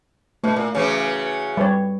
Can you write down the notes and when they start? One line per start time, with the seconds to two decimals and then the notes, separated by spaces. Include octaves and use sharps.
0.44 B2 A3
0.56 A#2
0.75 C#3 E3 F#3
1.57 G3 B4 C#5